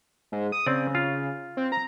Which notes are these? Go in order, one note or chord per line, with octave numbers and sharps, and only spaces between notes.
G#2
D#6
C#3 C4 D5
F4
C4
A#5